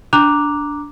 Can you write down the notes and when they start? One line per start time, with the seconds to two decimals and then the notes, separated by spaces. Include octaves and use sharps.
0.13 D4 A#5 D6 F#6 F7